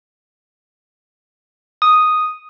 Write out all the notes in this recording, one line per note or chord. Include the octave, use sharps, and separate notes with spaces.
D#6